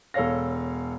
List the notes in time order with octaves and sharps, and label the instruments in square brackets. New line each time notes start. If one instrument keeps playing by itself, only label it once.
[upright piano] E1 A4 C#5 F5 A#6